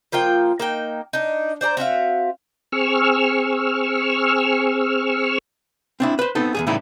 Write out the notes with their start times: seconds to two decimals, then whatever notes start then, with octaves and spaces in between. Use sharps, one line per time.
0.12 F3 A#3 F4 G5
0.60 A#3 D#4 G5
1.13 D4 D#4
1.61 C5 D5 G5 A#5
1.77 C4 F#4 E5 F5
2.72 C4 G#4 C#6 E6 F6
6.00 C4 D4 E4
6.19 B4 C5
6.35 B3 C4 D#4 A4
6.55 E2 C3 G#4
6.67 A2 C#3 E3 G3 D#4 E4